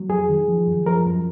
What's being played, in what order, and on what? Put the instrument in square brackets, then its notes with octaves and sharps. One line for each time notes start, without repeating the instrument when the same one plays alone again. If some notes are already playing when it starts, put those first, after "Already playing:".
Already playing: [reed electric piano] F#3
F2 G#4
D#3
F3
F#2
F3 A#4
F#2